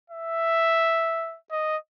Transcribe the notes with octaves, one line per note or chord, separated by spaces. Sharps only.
E5
D#5